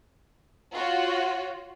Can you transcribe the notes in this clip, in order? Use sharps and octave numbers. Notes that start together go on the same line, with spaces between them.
F4 F#4 C#5